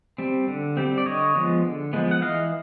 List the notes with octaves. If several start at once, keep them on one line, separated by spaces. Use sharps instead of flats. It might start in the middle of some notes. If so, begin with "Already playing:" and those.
G3 C4
D3
G3 C4
D5
D3 C#5 D#5
F3 G#3 B3
D3
F3 G#3 B3
F#5
E3 D#5 F5